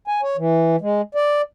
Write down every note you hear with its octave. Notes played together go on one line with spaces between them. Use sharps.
G#5
C#5
E3
G#3
D5